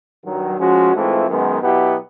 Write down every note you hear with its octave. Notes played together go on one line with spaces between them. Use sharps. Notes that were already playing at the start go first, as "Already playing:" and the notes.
G2 D#3 F#3
F3 G#3 C#4 F#4
G#2 E3 A3 C4 F4
F#2 D#3 G#3 B3
B2 F#3 B3 E4 G4